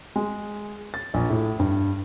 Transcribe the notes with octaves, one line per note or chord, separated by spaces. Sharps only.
G#3
A6
A#1
A2
G2